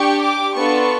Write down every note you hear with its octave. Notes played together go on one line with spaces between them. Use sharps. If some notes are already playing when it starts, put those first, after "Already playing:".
Already playing: D4 G4 C#6
D6
B3 D4 F4 A4 C#6